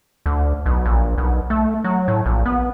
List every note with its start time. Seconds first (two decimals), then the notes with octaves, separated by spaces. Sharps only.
0.26 D2
0.66 B1
0.85 A#1
1.18 B1
1.50 A3
1.84 F#3
2.08 A2
2.26 A#1
2.46 B3